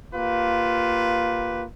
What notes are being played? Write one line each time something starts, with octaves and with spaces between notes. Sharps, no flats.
A#3 F4 G4 B4